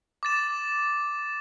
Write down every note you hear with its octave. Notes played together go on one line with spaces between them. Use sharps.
D6 A6 E7